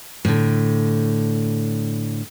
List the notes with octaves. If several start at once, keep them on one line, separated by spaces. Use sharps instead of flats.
A2 D3